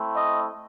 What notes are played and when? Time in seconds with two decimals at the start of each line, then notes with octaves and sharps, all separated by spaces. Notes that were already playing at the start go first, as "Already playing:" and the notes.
Already playing: A3 C4 E4
0.15 D#5